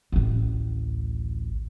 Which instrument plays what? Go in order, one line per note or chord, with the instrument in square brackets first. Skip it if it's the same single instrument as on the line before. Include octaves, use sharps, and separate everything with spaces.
[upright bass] A1 D2